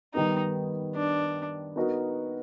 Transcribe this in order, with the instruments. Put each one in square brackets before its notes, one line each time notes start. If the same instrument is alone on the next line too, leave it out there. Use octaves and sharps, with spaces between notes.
[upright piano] D#3 G3 B3 [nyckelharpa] D#4
[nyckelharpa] D4
[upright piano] B3 D#4 F#4 A#4